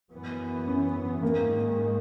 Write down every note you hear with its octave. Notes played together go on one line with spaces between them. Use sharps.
F#2 E3 B3
C#4
G#2 D#3 G#3 A#3